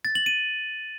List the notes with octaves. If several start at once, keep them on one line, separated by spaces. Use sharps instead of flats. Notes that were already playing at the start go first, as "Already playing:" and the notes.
A6
F#7
D#7